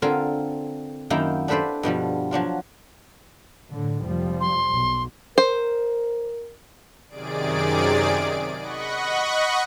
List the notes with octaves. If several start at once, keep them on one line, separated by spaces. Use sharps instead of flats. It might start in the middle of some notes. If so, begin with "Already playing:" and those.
D3 C4 F4 A#4 G#5
F#2 D#3 A#3 E4 G5 A#5
D4 G4 A4 B4 C5 D5
G2 B2 F3 G3
F3 F#3 D4 F4
A2 D3
F1 F3 G3
C6
B1
A#4 C5
F#2 C3 D#3 G#4 D5 D7
D#5 F#5 B5 C#6 F#6